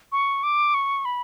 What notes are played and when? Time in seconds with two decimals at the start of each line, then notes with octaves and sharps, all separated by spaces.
0.12 C#6
0.43 D6
0.74 C#6
1.05 B5